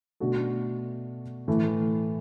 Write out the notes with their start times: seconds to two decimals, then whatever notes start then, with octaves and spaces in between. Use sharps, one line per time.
0.20 B2 A3 D4 F#4 A4
1.48 A2 E3 A3